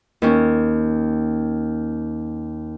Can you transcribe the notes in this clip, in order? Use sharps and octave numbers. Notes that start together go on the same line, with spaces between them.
D#2 C#4